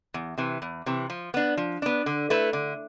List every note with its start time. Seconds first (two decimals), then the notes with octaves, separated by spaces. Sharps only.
0.14 E2
0.38 C3 E3
0.62 E2
0.86 C3 E3
1.10 F3
1.34 B3 D4
1.57 F3
1.82 B3 D4
2.06 D3
2.30 A3 E4 B4
2.53 D3